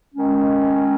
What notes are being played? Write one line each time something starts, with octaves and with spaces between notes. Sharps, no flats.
D#3 G#3 C#4